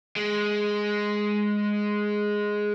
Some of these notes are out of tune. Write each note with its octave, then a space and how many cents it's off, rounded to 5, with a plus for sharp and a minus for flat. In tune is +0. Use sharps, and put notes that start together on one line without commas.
G#3 +0